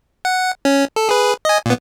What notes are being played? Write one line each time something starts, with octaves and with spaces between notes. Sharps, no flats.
F#5
C#4
A4
G#4 B4
D#5 G#5
A#2 B3